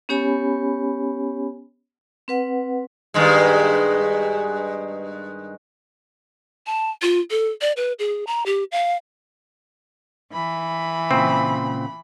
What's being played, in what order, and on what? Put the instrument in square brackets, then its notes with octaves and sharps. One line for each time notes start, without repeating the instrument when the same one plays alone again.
[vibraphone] B3 C#4 G4 C#5 G#5 B5
C4 B4 F#5
[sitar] G2 D#3 G#3
[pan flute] A5
F4
A4
D5
B4
G#4
A#5
G4
F5
[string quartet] E3 [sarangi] B5
[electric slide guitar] A#2 C#3 [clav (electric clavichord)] C4